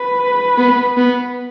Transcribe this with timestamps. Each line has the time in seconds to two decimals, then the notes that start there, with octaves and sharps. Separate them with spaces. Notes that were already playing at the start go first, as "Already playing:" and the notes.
Already playing: B4
0.58 B3
0.97 B3